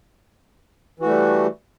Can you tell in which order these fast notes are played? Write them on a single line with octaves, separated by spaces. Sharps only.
E3 F#4 A3 G3